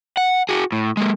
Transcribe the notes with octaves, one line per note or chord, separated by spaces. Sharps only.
F#5
F#4 G#4
A2
G#3 A#3